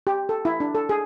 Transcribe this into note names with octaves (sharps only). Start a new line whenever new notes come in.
G4
A4
E4
D4
A4
G#4